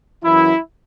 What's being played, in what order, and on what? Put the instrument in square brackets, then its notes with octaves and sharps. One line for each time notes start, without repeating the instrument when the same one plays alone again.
[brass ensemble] F#2 E3 E4